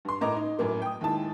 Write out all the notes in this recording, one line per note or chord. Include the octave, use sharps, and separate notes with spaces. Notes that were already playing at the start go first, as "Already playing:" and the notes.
G2 C6
A2 A#3 D#5 A#5 D6
D#4
F#2 A2 A#3
G5 D#6
D#2 G#3 E4 A5